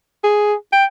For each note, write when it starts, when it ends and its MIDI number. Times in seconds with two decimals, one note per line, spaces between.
0.24 0.54 68
0.73 0.84 79